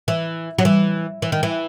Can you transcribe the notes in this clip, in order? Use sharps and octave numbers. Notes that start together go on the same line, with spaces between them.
E3
F#3
E3
E3
D#3
E3